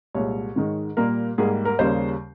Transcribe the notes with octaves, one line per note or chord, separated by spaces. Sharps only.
C2 A#2 G#3 C#5
G#2 D#3 G#3
A#2 G3 A#3 A#4
G#2 G3 A#3 G#4
A#4
D#2 C#3 G3 A#3 C5